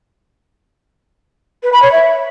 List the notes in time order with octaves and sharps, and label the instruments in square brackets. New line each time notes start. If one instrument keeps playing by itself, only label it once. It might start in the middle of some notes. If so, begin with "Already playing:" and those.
[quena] B4
B5
C#5
E5